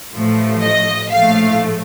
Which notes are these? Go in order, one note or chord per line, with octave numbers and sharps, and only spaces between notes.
A1 A2 F3 A3
D#5
A#1 A2 F3 A3 F5